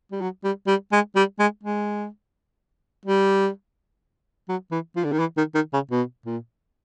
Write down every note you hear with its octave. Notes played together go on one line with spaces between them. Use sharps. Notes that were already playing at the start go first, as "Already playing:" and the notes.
G3
F#3
G3
G3
G#3
G3
G#3
G#3
G3
F#3
E3
F3
D3
D#3
E3
D#3
D#3
C#3
B2
A#2